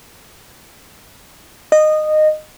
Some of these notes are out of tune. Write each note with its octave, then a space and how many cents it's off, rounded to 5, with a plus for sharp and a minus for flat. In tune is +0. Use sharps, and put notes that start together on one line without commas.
D#5 -15